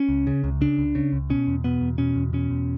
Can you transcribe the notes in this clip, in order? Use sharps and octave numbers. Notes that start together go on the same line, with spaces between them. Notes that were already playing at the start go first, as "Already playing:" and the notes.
Already playing: C#4
C#2
C#3
C#2
C#3 D4
C#2
C#3
C#2
B2 C#4
E2
B2 B3
E2
B2 C#4
E2
B2 C#4
E2